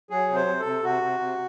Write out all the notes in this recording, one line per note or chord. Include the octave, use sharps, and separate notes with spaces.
F#3 G#4
C3
C5
C3
A4
C3
C3 F#4
C3
C3